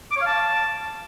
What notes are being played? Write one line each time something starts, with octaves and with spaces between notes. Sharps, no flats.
D6
C#5
F5
A5